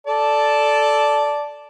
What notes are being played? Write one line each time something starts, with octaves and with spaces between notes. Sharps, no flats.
A4 D5 A5